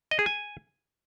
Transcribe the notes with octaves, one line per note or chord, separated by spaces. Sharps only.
D#5
G#4
G#5